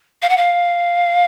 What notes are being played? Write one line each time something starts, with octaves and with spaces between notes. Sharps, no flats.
F5
F#5
F5